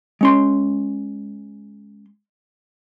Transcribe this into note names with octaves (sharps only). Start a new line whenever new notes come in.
G#3 C#4 C6